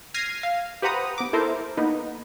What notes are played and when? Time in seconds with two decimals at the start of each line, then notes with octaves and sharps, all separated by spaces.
0.14 F6 G#6 A#6 C7 D#7
0.43 F5
0.82 G4 B4 C5 F#5 A#5 D#6
1.18 B3 D6
1.33 E4 A4 A#4 C5
1.77 A#3 B3 D#4